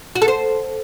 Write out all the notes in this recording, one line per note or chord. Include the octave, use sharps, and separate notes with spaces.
F#4
A4
C5